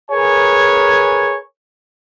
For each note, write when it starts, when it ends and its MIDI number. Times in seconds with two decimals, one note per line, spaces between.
0.11 1.37 68
0.11 1.37 70
0.11 1.37 71
0.11 1.37 73
0.11 1.37 80